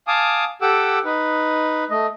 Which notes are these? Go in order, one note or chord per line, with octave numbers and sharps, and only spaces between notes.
F5 G#5 A5 D6 D#6
G4 A4 F#5 D6 E6
D#4 B4
A3 D#5